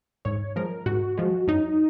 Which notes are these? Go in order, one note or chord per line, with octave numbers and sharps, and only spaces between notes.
G#2 C#5
F3 G#3 A#4
G#2 F#4
F3 G#3
F#2 D#4